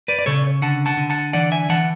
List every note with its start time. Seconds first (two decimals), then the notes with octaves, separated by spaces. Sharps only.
0.08 B4 D5
0.19 D5
0.26 C#3 A4 C#5
0.62 D3 F#5 A5
0.86 F#5 A5
0.97 D3
1.10 F#5 A5
1.33 E3 D5 F#5
1.52 E5 G#5
1.69 E3 F#5 A5